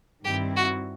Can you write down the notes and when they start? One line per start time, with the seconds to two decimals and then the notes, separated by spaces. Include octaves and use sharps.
0.24 G2 D#3 G3 C4 E4 G4
0.56 F#4